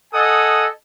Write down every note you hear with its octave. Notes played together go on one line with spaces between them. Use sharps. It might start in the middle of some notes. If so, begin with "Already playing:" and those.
A4 D#5 F#5 G#5 D#6